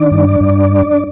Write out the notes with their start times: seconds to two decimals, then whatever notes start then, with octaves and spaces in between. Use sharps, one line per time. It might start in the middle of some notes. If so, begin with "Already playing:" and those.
Already playing: D#3 D4 D5
0.11 G2
0.40 G2